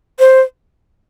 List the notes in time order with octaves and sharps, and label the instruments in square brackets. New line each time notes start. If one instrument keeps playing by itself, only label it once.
[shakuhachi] C5